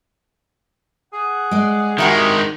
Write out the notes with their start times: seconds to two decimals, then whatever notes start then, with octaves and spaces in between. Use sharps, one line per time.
1.13 G#4 F#5
1.51 G#3 D5
1.98 D#3 G#3 D4 E4 F#4 G4